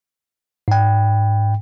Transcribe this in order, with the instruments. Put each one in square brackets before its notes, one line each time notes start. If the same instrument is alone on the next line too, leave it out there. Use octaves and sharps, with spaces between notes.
[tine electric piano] G#2 G5